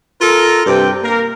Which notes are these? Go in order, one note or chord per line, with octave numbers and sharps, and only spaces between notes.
F4 A4 A#4
G2 C3 G5
A#3 A#4